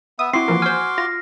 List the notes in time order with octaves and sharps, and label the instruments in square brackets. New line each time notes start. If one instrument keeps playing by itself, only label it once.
[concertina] B3 E5 [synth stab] D#6
[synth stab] C4 E4 [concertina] F#4 C6 D6 [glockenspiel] C7
[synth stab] E3 F3 A#3
[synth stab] C5 G#5 [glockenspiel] F6
[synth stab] F4 [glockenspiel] A#6